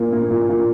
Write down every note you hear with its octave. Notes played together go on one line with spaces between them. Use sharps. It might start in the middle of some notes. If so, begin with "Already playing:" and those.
Already playing: A#2 A#3
A#3
A#2
A#2